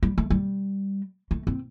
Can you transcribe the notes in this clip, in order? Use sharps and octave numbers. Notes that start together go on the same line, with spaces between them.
G3
A3
G3
A3
C4